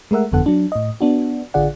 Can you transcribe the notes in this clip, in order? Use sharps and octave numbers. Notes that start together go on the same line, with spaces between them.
G#3 A3 A#4 E5 F#5
G1 F2 D3 B3 A4 F#5
F#3 D4
A2 D#5
B3 D4 F#4
A1 D3 F4 G#4 D5 F#5